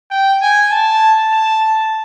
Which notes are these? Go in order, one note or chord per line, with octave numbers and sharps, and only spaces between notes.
G5
G#5
A5
A5